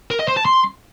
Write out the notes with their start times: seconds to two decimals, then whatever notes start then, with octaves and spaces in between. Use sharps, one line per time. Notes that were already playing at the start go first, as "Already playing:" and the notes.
0.11 A#4
0.19 D#5
0.28 C5
0.37 A5
0.45 C6